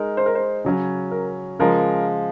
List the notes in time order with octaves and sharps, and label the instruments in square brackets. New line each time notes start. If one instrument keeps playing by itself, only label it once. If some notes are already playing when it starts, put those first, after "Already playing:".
Already playing: [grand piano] G#3 D#4 A#4
[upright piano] C5
A#4
C5
[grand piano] C#3 F#3 C#4
[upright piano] A#4
[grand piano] C#3 F3 G#3 [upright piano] A#4